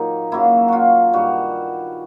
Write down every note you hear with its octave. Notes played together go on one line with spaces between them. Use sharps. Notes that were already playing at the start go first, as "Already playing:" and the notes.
Already playing: A#2 F#3 A#3 D#4
C#3 F#3 A#3 E4
F4 F#4
G2 D#3 G3 F#4